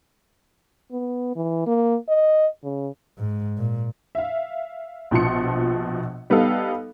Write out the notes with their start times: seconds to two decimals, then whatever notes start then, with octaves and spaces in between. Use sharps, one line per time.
0.92 B3
1.36 E3
1.67 A#3
2.09 D#5
2.63 C#3
3.19 G#2
3.58 A#2
4.15 E5 F5
5.11 A#1 B2 F3 A5 C6 C#7
6.30 G3 B3 D#4 A4 F5